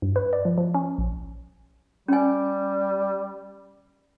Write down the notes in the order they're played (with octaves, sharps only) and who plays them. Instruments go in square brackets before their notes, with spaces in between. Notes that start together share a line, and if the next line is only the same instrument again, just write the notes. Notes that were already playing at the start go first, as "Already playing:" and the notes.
[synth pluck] G2
B4
D5
F3
F3
C#4
A#1
[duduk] G3 [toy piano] C#4 G#5